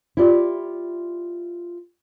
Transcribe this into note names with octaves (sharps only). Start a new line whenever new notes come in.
E4 F4 G4 D5